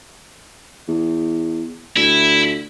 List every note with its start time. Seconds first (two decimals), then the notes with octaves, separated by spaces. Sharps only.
0.88 E2
1.96 D2 E4